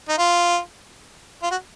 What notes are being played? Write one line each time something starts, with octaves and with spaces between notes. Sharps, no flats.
D#4
F4
F4
F#4